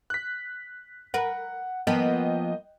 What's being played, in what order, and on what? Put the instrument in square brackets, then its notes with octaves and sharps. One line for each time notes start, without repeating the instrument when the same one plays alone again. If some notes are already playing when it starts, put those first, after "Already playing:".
[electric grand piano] F#6 B6
[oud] A#4 B4 [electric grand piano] F#5
[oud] F3 A#3 B3 [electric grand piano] D#5 G5